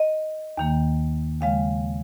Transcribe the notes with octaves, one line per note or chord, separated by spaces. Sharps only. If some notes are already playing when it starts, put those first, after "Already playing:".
Already playing: D#5
D#2 D#3 A#3
D#2 C#3 F3 G#3 F5